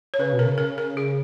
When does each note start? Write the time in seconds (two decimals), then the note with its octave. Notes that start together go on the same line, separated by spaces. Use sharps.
0.14 C#5
0.19 C#3 B4
0.33 B2
0.39 A#4
0.45 C#3
0.58 A#4
0.78 A#4
0.97 G#4